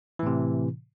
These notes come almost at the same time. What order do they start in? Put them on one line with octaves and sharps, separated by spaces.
E3 A2 C3